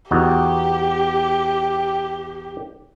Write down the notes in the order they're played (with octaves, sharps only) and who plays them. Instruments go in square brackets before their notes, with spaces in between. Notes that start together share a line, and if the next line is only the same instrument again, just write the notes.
[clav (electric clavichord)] E2 D#4 F#4 [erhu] G4